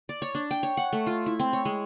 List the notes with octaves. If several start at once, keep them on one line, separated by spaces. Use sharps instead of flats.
D5
C#5
D4
G5
C#5
F#5
A3
F4
E4
C4
C#5
G#3